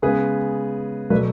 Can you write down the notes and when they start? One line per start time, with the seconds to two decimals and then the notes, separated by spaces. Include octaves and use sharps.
0.02 C#3 G#3 B3 G#4 B4
1.10 B2 F#3 A3 B4 D5